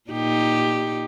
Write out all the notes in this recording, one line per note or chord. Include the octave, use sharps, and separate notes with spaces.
A#2 D#4 G4